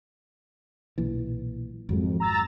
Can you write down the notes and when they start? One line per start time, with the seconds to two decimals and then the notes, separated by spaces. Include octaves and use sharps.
0.98 B1 A#2 E3
1.89 G#1 F2 F#3 G#3
2.20 A#5 E6 A6